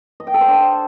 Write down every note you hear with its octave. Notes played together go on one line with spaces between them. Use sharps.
D#5
G5
A4
C5
D4